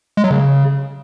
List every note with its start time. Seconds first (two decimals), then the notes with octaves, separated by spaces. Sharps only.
0.17 G#3
0.24 F#3
0.31 C#3